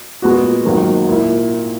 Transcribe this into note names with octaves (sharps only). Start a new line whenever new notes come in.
A#2 G#3 B3 F#4
G#1 G#2 D#3 F#3 A#3
A#2 A#3 E4